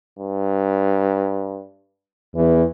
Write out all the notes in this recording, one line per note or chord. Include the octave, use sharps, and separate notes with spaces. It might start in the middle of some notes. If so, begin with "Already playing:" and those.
G2
E2 E3